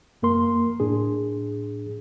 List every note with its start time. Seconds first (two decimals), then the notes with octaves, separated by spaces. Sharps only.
0.22 F#2 A#3 A#4 C6
0.80 A2 D4 G#4